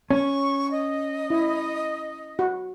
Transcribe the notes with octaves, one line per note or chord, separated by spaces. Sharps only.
C#4 C#6
D#5
E4
F#4